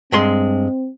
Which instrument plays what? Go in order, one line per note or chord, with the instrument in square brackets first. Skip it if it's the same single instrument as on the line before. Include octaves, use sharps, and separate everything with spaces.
[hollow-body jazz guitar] G2 G#3 C6 [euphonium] C4